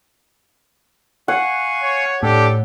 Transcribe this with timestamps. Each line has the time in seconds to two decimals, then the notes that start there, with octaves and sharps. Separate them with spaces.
1.28 F5 F#5 G#5 C#6
1.82 C#5
2.23 A2 D4 G4 A4